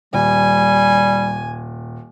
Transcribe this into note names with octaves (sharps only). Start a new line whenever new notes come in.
D#1 G3 G#5